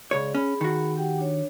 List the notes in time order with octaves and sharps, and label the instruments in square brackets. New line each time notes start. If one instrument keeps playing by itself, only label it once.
[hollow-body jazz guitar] C#2 C#5 [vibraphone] G#4 D5
[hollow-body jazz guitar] C#4 [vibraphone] G#4 B5
[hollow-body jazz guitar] D#3 F#4
[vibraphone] G4 F#5 G5
D4 C#5